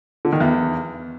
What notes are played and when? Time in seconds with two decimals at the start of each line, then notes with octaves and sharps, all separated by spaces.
0.25 D3
0.33 D#3
0.40 E2